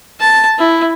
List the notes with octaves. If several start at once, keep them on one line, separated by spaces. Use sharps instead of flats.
A5
E4